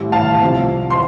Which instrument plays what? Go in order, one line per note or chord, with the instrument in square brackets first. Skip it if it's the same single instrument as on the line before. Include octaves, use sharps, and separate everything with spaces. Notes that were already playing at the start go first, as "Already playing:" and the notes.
Already playing: [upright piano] A1 A2 G3
F5 A5
C2 C3 F3
C6